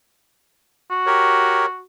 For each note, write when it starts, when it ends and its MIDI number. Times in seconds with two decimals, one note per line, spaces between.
0.90 1.83 66
1.06 1.66 67
1.06 1.66 70
1.06 1.66 73